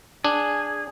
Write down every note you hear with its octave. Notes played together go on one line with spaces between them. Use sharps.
D4 G#4